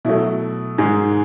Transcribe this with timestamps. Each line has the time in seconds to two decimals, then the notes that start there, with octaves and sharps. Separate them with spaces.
0.05 B2 F#3 A3 E4
0.78 G#2 D#3 G#3 G#4